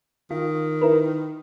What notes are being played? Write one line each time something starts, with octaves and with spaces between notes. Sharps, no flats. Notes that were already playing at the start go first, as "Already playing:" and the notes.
D#3 F4
E4 A#4 B4